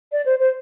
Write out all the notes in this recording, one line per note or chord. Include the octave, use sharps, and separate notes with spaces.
D5
C5
C5